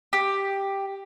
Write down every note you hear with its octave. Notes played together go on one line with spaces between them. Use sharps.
G4